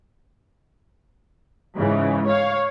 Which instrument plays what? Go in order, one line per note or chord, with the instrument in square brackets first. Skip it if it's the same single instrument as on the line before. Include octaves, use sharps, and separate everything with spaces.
[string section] G#2 C#3 E3
C#5 F5